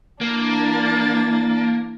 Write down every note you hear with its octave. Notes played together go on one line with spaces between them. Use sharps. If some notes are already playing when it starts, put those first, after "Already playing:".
E3 A#3 D4 A6